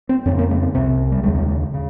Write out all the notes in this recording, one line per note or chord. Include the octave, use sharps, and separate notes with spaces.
C4
F2 C#3 C#4
A#3
G#3
C4
C2 C3 C4
G3
D#2 C#3 G#3
C#3